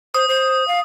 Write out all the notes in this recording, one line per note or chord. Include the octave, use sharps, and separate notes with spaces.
C5 D#6
C5
F5